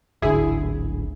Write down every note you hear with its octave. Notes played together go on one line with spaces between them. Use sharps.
D1 G#1 D3 E4 G#4